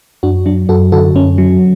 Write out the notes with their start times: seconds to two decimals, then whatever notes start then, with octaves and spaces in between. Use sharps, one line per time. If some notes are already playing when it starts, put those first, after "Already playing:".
0.23 F#2 D4 F#4
0.46 F#3 D4
0.69 F#2 F#4 A4
0.92 D3 F#4 A4
1.15 F#2 C#4
1.38 F#3